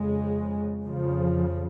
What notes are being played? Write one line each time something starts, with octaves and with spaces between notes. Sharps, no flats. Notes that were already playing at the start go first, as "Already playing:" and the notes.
Already playing: F2 C#3 G#3
F2 C#3 F3